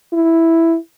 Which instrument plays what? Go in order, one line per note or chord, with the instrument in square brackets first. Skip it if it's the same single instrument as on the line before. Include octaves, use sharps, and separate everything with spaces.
[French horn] E4